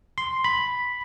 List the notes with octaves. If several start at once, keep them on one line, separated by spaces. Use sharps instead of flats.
C6
B5